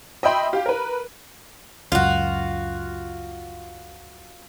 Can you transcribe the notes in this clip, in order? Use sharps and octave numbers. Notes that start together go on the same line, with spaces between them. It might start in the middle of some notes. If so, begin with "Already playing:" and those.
D#5 E5 G5 B5 C6
G4 F5
A#4 B4
C#2 F#2 F4 F#4